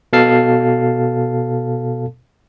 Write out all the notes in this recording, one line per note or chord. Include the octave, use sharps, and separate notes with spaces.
B2 A4 F5 A5 C7